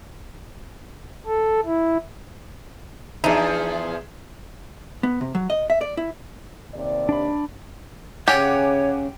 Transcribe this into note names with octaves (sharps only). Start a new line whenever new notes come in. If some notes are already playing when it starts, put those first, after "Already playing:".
A4
E4
E2 F3 D4 D#4 G#4 E5
B3
C3
F#3
D#5
E5
D5
E4
D#2 C3 D5
D4 B5
C#3 G4 C#5 F#5 G#5 D6